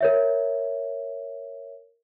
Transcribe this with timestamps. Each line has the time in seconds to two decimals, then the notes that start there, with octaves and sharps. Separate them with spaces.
0.01 A#4 C#5 E5